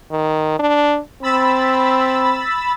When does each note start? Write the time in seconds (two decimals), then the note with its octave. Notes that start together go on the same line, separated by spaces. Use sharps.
0.11 D#3
0.59 D4
1.23 C4 B5 E6 A6